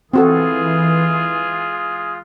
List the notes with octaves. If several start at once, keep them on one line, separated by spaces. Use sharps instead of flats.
E3 G#3 C4 F4 F#4 G#4 A4